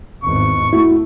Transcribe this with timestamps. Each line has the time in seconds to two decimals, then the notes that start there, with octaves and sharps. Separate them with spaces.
0.24 G#1 E2 C#6
0.73 A3 E4 F#4